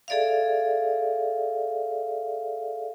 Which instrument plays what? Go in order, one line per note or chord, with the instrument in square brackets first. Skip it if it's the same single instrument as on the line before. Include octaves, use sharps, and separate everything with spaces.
[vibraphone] G#4 A4 D5 E5 F5